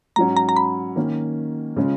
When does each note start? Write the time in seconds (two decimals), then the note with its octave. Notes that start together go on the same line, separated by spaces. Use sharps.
0.16 G#2 F#3 C#4 A#5
0.37 A#5
0.49 A#5
0.57 B5
0.96 D#3 A#3 C#4
1.76 C#3 G#3 C#4 F4